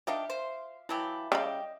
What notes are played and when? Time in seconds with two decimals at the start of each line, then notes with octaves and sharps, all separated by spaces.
0.07 D4 D#4 G4 E5 F5 D6
0.30 C5
0.89 E3 F#3 E4 G4 A5 B5
1.32 C#3 G3 G4 D#5 G5 B5